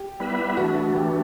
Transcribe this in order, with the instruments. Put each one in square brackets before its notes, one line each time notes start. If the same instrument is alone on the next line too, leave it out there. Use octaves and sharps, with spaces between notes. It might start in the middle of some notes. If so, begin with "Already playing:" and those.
Already playing: [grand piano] G4
[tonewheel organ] G3 B3 E4 B4 E5
[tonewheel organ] E3 A3 D4 [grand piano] F#4
[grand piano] F#4
[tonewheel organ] E3 A3 D4 [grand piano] G4